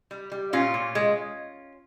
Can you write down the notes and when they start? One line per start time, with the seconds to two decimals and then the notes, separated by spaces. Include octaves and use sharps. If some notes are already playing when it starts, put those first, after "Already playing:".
0.11 G3
0.32 G3
0.53 A#2 C#4 F4
0.74 A#2
0.95 G#3